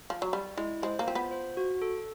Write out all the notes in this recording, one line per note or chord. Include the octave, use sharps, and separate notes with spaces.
F3
F#3
G3 D5
G#3 E4
G#3 C5
A#3
C4 F4
B3
C5
F#4
A4